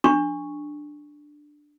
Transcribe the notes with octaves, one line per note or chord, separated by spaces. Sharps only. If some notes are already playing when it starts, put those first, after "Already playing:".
D4 C#6